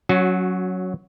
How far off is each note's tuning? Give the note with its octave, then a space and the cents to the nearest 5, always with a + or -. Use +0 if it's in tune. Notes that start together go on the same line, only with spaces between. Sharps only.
F#3 +0 C#4 +0 F#4 -25